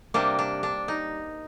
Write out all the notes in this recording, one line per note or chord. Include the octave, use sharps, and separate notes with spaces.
C3 G3 A#3 D4
D4
D4
D#4